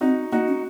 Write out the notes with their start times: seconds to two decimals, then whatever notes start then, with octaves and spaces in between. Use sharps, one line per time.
0.01 C4 D#4 F#4
0.32 A#3 D#4 F#4
0.48 C#4